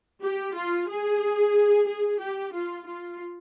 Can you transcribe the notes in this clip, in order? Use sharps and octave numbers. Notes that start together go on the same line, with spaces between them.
G4
F4
G#4
G#4
G4
F4
F4